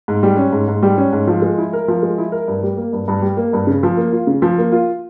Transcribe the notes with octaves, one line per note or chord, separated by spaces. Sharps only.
G#2
G3
C#4
G#2
G#2
G3
C#4
G#2
F3
G#3
E4
A#4
F3
G#3
E4
A#4
G2
G3
A#3
G2
G2
G3
A#3
G2
C#3
F3
A#3
F4
C#3
F3
A#3
F4